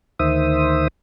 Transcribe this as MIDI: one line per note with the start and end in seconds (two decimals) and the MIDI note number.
0.19 0.88 38
0.19 0.88 51
0.19 0.88 72
0.19 0.88 76
0.19 0.88 87